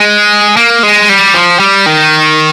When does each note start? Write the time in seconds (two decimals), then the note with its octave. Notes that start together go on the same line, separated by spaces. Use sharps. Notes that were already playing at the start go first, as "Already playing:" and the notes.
Already playing: G#3
0.57 A#3
0.83 G#3
1.09 G3
1.34 F3
1.60 G3
1.86 D#3